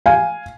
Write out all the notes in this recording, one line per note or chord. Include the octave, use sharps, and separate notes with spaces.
F5 G#5